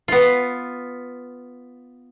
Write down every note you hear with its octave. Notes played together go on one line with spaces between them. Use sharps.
B3 F4